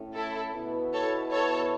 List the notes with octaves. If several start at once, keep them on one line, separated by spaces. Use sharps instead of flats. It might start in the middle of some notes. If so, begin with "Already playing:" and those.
Already playing: A2 A3 C#4
E4 A4
B2 B3 E4
A4 C#5
A4 C#5